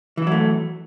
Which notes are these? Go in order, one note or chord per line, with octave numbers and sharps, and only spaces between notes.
E3 F#3 A3 E4